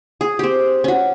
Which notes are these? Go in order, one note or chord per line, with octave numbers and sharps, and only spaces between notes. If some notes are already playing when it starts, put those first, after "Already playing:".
G#4
C4 G4
C#4 F#4